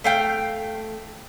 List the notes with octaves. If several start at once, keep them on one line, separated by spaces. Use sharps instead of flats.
A3 F5 G5